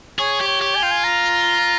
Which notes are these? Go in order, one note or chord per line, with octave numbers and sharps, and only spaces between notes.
G#4 C#5
G4
C#5
G4
G#5
F4 G5
G#5
A#5